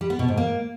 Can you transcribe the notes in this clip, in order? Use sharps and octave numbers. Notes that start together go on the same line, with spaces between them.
G3
B3
B2
G#2
A#3